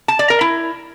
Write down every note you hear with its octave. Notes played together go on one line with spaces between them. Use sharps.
A5
D5
A#4
E4